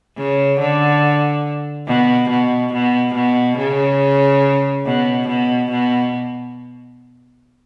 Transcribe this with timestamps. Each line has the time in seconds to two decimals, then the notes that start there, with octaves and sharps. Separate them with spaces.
0.17 C#3
0.60 D3
1.87 B2
2.29 B2
2.73 B2
3.14 B2
3.57 C#3
4.85 B2
5.28 B2
5.71 B2